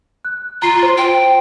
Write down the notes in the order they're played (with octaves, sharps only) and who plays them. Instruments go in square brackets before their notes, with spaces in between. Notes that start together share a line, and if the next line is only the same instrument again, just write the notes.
[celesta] F#6
[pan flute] F4 [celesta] A#5 C7
[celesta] C5
[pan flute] G5